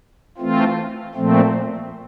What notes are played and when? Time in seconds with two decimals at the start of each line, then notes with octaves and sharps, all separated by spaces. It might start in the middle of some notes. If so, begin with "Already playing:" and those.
0.38 E3 A3 C4 F4
1.15 A#2 F3 A3 C4